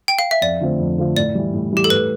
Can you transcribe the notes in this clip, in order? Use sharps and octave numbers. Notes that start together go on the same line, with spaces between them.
G5
F5
E5
F2 D5
D3 F3 A3 C4
F2
D3 F3 A3 C4
A2 D5
E3 G3
A2
E3 G3 G4
A4
A2 B4